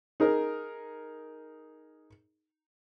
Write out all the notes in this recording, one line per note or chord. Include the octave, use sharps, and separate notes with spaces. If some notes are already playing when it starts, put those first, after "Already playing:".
D#4 G#4 A#4